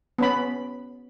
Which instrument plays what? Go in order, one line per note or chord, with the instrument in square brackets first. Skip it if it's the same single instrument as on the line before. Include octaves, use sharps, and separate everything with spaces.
[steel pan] B3 C#4 B5